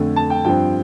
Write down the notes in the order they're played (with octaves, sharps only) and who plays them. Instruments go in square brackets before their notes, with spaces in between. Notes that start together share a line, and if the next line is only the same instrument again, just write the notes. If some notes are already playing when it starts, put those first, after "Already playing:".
Already playing: [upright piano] F2 D3 A3
A5
G5
G2 F3 C4 G5